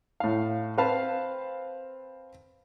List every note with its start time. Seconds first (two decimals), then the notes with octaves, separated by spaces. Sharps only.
0.20 A2 F5
0.78 C4 B4 F5 A5